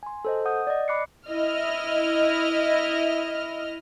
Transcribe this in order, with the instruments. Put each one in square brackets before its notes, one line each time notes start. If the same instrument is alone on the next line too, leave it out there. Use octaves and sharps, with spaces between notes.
[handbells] G#5 C6
A4 C5 D#5
F#5 D#6 G6
D5 D#5
B5 D6 F#6 C7 C#7
[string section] E4 D#5 F6